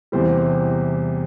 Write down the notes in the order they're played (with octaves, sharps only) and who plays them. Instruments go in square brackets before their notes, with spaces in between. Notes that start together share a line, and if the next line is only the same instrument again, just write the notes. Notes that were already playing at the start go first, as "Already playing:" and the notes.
[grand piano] E2 C3 E3 G3 C5